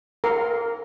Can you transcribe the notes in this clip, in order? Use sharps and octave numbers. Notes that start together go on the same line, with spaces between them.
A#4